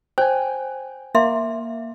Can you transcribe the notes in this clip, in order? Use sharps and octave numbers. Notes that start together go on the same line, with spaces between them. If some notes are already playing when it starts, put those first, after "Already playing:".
C5 G5 G#5
A#3 E5 C6